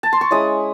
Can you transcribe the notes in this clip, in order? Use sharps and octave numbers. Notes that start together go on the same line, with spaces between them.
A5
C6
C#6
G#3 C#4 E4 D#6